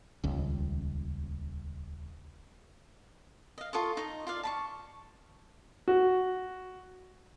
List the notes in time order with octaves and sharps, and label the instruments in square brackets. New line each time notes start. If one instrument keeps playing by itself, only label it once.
[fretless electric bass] D#1 C#2
[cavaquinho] D#5 F5
F4 A4 D#5 C#6
D#4 D#5
F4 D5 F5
A5 B5 C#6
[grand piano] F#4